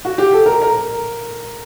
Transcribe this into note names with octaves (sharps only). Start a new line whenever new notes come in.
F#4
G4
A4
A#4
A#4